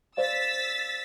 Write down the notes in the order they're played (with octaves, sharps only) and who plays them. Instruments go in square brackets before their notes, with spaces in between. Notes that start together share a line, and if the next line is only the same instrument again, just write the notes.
[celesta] C5 D5 F5 [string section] E6 A6 B6